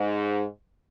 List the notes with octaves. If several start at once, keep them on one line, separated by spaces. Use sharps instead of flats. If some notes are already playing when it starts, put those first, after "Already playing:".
Already playing: G#2